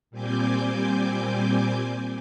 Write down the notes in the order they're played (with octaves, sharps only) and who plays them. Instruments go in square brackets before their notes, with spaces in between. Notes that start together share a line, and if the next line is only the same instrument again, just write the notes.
[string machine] A#2 G3 C4 G#5 D6 G6